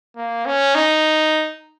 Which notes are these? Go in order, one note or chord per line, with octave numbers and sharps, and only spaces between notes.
A#3
C#4
D#4